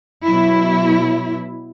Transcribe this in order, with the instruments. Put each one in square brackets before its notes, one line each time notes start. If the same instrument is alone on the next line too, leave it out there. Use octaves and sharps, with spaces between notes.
[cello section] B2 F#3 E4